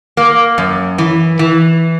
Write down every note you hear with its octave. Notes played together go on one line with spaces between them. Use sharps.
A#3
F#2
E3
E3